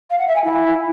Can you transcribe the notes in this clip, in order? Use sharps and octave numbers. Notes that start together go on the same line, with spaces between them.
F5
F#5
E5
G#5
E4